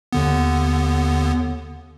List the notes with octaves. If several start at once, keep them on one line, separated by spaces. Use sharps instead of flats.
D#2 D3 B3